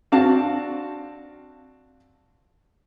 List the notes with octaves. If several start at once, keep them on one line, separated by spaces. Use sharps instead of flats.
C4 D4 F#4 F5 A5